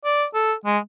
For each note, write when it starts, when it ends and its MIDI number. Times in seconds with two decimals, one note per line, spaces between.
0.05 0.25 74
0.34 0.53 69
0.66 0.78 56